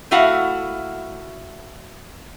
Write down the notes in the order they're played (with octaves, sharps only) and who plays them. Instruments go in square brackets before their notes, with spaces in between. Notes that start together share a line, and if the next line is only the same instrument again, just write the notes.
[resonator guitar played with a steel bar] A3 E4 F#4 F5 F#5